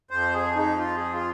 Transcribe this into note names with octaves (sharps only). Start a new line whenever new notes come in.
F2 F3 C5
G#4
D#4
F4
G#4
F4